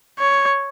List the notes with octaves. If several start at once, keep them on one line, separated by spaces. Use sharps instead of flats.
C#5